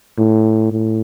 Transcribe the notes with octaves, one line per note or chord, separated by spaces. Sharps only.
A2
A2